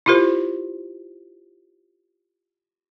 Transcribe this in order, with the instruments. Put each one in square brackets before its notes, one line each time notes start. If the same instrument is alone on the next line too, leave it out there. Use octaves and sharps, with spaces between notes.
[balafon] E4 F4 G4 A#4 C5